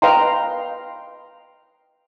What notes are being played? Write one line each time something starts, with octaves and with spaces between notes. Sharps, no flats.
B4 D#5 F5 G5 A#5 C6